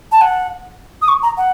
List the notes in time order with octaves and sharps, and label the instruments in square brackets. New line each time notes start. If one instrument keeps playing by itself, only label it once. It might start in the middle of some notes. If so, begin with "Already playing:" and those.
[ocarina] A5
F#5
D#6
C#6
A#5
F#5